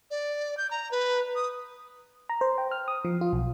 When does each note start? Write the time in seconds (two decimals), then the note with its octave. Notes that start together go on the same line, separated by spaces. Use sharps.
0.11 D5
0.57 G6
0.71 A#5
0.91 B4
1.35 D#6
2.29 A#5
2.41 C5
2.58 G5
2.71 F6
2.88 D#6
3.05 F3
3.21 F4
3.33 B1